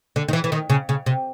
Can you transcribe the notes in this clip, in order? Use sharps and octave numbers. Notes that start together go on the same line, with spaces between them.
D3
D#3
E3
E3
D#3
C#3
C#3
C3